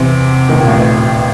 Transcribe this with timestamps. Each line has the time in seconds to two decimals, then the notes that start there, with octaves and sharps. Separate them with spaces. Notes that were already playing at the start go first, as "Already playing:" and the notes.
Already playing: E2 C3 E3
0.48 D#2 D#3
0.59 A#2
0.67 A1 A2